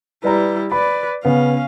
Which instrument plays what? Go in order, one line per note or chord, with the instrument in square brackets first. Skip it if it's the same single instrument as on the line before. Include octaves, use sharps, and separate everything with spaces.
[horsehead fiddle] G3 E4 [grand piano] B4 D5 A#5
[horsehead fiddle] B4 D5 [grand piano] B5
[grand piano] C#3 B3 [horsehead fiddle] C#4 F5